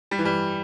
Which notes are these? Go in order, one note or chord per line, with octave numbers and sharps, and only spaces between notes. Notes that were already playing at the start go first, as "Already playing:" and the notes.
G3
E3
G3